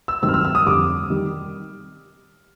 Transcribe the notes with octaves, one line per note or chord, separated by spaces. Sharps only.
E6
G2 D#3 F#3 A3 C4 E6
F6
E6
E6
D#6
F2 D3 G3 D6
D#3 G3